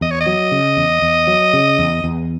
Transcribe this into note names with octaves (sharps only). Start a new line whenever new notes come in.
E2 D#5
C#5
D#5
F#3
C#3
E2
E2
F#3
C#3
E2
E2